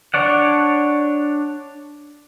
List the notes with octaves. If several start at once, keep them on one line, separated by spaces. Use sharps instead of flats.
D4 C#5 D5 F#5